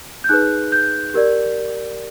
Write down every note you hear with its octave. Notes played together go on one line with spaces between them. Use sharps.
G6
D#4 G#4 B4 F#6
G6
G4 A#4 D5